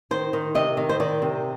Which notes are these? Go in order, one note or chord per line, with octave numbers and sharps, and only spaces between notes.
D#3 C5
D#3
C3 D#5
D#3
C5
D#3 D5
C3